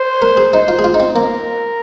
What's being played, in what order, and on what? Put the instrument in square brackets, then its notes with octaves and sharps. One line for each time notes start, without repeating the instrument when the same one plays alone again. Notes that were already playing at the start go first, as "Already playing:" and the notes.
Already playing: [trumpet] C5
[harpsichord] A#4
G#4
[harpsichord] D#4 [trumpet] C5
[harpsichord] F4
G#4
F4
D#4
C4
[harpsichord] A#3 [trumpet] A#4